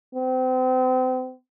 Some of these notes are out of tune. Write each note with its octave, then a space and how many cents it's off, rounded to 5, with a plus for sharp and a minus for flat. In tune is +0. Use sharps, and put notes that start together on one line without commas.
C4 -35